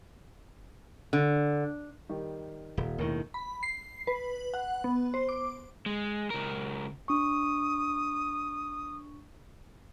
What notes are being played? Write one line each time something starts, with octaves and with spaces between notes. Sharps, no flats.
D3
D#3 G3
D#1
E1 D#2 A2 D#3 A#4
B5
C7
B4
F#5
B3
C5
D6
G#3
C#2 A#4
D4 C#6 D#6